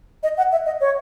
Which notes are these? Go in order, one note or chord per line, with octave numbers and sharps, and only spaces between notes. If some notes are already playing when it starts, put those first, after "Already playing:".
D#5
F#5
E5
D#5
C#5